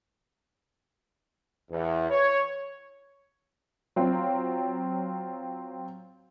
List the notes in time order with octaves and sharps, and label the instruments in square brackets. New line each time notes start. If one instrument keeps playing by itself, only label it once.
[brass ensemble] E2
C#5
[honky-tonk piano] F#3 C4 F4